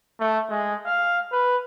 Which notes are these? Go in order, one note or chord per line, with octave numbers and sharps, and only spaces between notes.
A3
G#3
F5
B4